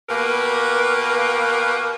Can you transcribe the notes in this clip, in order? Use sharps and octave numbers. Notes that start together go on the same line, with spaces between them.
B2 A#3 G4 A#4 B4